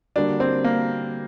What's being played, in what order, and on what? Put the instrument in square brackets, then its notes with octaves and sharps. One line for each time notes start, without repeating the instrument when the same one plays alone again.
[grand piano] D3 G3 A#3 F#4 [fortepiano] D4
[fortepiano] C4
A#3